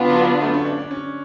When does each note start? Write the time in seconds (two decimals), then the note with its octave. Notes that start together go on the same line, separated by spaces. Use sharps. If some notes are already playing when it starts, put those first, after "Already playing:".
Already playing: D3 B3 D4 F4
0.09 F#3
0.28 F#3
0.41 A3
0.54 C#4
0.65 D4
0.78 D4
0.91 C#4